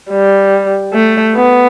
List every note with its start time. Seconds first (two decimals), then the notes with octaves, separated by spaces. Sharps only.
0.11 G3
0.93 A3
1.35 B3